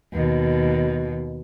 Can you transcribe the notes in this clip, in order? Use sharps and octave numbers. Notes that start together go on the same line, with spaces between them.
D#2 B2